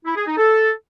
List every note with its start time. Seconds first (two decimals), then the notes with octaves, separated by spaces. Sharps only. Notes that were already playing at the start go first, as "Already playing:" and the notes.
0.05 E4
0.16 G#4
0.27 D#4
0.37 A4